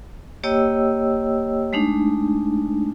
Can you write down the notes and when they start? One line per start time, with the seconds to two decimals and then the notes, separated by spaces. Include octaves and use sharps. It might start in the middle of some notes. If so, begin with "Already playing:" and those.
0.44 A#3 G4 C#5 D#5 G5 E6
1.73 G#3 A3 D4 D#4